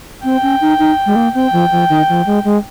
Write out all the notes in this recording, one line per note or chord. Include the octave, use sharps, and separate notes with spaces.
C4 G5
C#4
D#4
D#4
G#3
A#3
C4 G5
F3
F3
D#3
F3
G#3
G#3